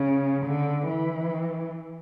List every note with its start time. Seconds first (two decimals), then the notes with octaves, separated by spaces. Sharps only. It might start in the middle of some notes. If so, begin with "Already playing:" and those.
Already playing: C#3
0.45 D3
0.87 E3